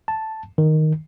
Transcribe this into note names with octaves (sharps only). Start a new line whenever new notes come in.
A5
D#3